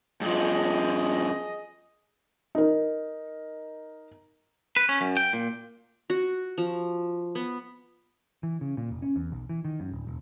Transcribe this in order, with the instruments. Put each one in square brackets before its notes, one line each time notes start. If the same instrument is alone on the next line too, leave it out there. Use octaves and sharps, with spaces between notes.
[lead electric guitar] G2 F3 [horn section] G#4 D#5
[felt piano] D#4 A#4
[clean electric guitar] B4
C#4
F#2
G5
A#2
[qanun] F#4
F3
B3
[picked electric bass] E3
C#3
A#2
F1
C#4
E2
B1
E3
D#3
F#2
D1
E1